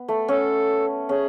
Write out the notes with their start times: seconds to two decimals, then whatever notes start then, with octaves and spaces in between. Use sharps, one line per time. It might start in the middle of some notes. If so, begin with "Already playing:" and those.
Already playing: B3
0.08 A3
0.28 C#4 A4
1.09 C#4 G#4